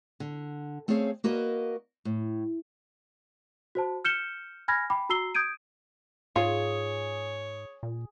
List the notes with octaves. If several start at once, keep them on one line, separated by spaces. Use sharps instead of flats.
D3
A3 C4 C#4 G#4 C#5 F5
A#3 F#4 A#4 B4 D#5
A2
F#4 C5 A5
F6 G6 C#7 E7 G7
G#5 B5 F6 G#6 A#6
G5 B5 D6
F#4 A#5 E6 C7 G7
D#6 G6 G#6 D7 D#7
G#2 F4 G#4 C#5
A#2